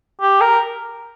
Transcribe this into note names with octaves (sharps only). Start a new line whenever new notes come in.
G4
A#4